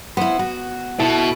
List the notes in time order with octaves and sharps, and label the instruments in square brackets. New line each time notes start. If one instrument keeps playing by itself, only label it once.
[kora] B3 [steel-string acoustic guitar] E4 C5
[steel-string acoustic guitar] F#4
[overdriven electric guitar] B2 [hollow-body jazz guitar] E4 [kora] A4